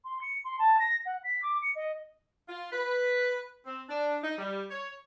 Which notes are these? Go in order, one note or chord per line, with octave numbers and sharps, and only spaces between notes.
C6
C#7
C6
A5
A#6
F#5
B6
D6
C#7
D#5
F4
B4
C4
D4
D#4
G3
C#5